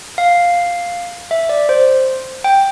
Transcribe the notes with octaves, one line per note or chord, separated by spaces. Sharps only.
F5
E5
D5
C5
G5